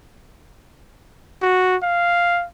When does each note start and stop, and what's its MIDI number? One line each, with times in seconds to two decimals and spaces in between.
1.42 1.76 66
1.83 2.45 77